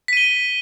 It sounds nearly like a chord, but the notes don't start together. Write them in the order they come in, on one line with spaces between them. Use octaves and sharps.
B6 D#7 G7